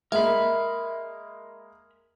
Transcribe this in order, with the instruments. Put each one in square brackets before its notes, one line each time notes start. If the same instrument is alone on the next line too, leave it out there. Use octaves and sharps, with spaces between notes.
[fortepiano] G#3 A#3 [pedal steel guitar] A#4 B5 [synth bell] E5